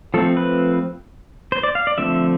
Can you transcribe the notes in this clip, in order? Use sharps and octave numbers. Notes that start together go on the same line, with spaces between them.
F3 A3 C4 A4
B4
C5
D5
F5
D5
D3 F3 A3 C4 E5